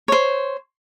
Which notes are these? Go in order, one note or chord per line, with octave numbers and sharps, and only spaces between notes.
C5 C#5